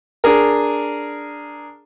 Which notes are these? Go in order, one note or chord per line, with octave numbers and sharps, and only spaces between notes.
D4 G#4 A#4